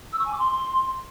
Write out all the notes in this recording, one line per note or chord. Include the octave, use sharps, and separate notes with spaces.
E6
C#6
G#5
D6
C6